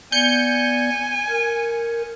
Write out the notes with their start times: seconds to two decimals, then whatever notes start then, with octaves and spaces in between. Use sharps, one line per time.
0.12 B3 D5 G#5 G6 C#7
1.30 A#4